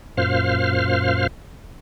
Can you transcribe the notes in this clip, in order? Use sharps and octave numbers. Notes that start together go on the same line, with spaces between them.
F#2 A#2 C5 F5 F6